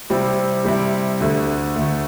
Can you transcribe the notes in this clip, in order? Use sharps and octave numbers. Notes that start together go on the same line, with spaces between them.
C3 G3 C4 E4
C3 G3 C4 E4
D2 D3 A3
D2 D3 A3